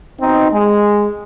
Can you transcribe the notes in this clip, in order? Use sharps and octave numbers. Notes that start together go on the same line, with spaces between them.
B2 C4 D#4
G#3